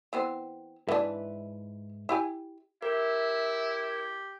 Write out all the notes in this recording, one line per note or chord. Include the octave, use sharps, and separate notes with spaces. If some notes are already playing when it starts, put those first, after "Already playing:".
E3 B3 C4
G#2 E3 D4 B4 E5
E4 G4 G#5
E4 G4 A#4 E5